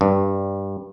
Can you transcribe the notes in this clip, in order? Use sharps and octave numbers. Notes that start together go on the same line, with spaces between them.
G2